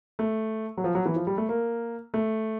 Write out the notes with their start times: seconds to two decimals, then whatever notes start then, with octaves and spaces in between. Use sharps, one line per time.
0.19 A3
0.77 F#3
0.84 F3
0.95 F#3
1.06 E3
1.16 F3
1.27 G3
1.38 A3
1.49 A#3
2.14 A3